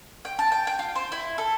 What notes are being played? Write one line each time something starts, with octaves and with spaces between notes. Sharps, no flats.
G5
A5
G5
G5
F4
C5
E4
A4